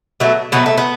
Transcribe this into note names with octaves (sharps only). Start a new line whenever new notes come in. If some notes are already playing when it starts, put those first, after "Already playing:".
B2 F#3 A3
B2 F#3 A3 B3
A3
B3